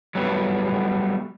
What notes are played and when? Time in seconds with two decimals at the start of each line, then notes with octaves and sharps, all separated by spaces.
0.15 F#3 G3 A3 B3